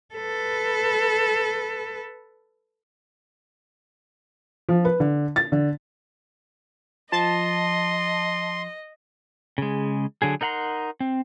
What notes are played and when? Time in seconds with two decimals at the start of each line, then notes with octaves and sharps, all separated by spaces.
0.15 A4 B4
4.69 F3
4.85 B4
5.00 D3
5.36 A6
5.52 D3
7.12 F3 D#5 A5 C6
9.58 C#3 G#3
10.22 D3 F#3 G#4
10.41 D#4 A#4 F#5 A#5 C6
11.00 C4